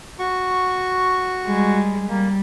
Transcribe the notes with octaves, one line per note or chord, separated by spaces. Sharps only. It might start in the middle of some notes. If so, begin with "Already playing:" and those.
F#4 C#6
G3 G#3
G3 A#3